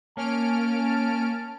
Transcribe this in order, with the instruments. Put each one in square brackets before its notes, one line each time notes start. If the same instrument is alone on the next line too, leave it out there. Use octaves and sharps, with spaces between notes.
[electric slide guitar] A#3 [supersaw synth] C#4 F6 D7 [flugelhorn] A5